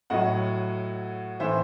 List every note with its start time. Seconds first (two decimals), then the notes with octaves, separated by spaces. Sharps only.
0.10 A2 F#3 D#5 F#5
1.40 A2 E3 C5 E5